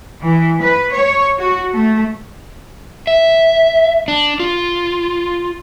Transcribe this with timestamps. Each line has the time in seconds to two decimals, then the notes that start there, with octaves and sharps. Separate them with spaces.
0.21 E3
0.60 B4
0.91 C#5
1.38 F#4
1.73 A3
3.07 E5
4.08 D4
4.40 F4